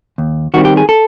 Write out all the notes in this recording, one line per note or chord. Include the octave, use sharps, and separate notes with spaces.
D#2
D#3 G3 C4 F#4
G4
G#4
A4